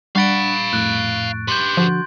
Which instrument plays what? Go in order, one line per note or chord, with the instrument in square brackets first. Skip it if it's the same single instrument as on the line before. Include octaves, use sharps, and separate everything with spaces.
[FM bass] G3 [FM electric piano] D4 F#5 [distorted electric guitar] F5 B5 [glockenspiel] C#6 A6 D7
[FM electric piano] F2 A2 [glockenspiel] F#6
[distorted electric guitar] G4 B4 [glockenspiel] C6 G6
[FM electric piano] D3 F#4 [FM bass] F3